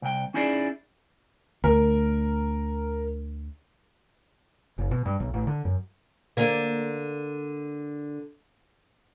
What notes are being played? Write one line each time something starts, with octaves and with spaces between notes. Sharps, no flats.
C2 G5
C#4 D#4 E4 G#4 D5
D2 A#4
F#1
B2
G2
B1
A1
D3
F#2
D3 A#3